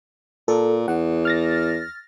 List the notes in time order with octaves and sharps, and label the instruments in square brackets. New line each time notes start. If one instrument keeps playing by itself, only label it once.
[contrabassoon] A#2 [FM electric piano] A4
[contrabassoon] E2 [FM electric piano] F#5
[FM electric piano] F6 A6 A#6